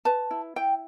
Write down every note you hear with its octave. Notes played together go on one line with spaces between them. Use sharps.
B4 A5
E4
E4 G5